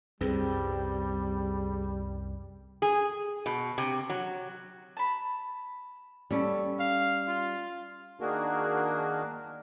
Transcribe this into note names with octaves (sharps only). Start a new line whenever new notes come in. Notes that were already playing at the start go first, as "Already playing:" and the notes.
C2 F#2 G3 C4 G#4 B4
G#4
B2
C3
F#3
A5 B5
G3 C#4 A4
F5
F4
D#3 A#3 D4 F#4 G#4 A#4